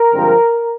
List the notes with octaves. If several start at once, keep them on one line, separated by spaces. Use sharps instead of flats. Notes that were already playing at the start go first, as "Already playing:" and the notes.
Already playing: A#4
G2 D3 F3 G#3 C4